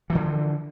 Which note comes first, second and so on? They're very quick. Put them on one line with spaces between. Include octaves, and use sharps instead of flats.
E3 F3 D3